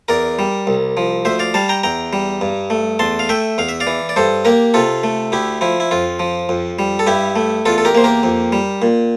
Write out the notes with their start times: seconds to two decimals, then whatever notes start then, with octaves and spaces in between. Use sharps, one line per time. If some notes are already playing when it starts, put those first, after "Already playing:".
0.08 E2 A#4 D5
0.39 G3
0.67 C2
0.97 F3
1.25 D2 C5 E5
1.39 D5 F5
1.54 G3 F5 A5
1.69 G5 A#5
1.83 E2 G5 A#5
2.13 G3
2.41 G2
2.70 A3
2.99 E2 A5 C6
3.19 F5
3.29 A3 E5 G5
3.58 E2 F5
3.69 E5
3.80 D5 F5
3.87 E3
4.09 D5
4.16 G2 A4 C5
4.45 A#3 G4 A#4
4.74 C3 F4 A4
5.04 A3
5.32 D2 E4 G4
5.61 F3 E4
5.80 E4
5.91 F2 F4
6.19 F3
6.49 F2
6.79 G3
6.99 A4
7.07 G2 E4 G4
7.36 A3
7.66 E2 F4 A4
7.78 A4
7.85 G4 A#4
7.95 A#3 C5
8.04 G4 A#4
8.23 F2
8.52 G3
8.82 A#2